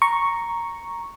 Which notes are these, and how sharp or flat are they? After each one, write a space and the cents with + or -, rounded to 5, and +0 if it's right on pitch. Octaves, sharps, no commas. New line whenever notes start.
A#5 +0 C#6 +0